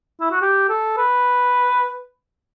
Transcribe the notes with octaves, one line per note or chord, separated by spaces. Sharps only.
E4
F#4
G4
A4
B4